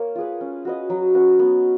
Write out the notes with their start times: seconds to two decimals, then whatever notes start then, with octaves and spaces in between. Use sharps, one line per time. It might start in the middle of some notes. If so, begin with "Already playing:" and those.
Already playing: A#3 A#4 C#5
0.15 F4 G#4 B4
0.41 C#4
0.65 F#4 B4 D#5
0.90 F#3
1.14 C#4 F#4 B4
1.39 B3